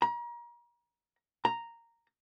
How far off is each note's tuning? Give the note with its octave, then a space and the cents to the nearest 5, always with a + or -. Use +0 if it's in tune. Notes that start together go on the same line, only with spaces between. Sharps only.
A#5 +35
A#5 -5